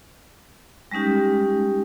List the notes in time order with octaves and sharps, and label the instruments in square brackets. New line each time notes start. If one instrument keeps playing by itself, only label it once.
[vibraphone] G3 G#3 C#4 D#4 G4